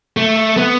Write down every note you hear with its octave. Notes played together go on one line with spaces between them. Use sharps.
A3
B3